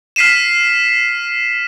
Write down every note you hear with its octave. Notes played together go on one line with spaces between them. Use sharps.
F6 B6 C7 D#7 E7